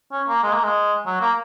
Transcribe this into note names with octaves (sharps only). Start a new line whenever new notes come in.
C#4
A#3
G#3
A#3
G#3
F#3
A#3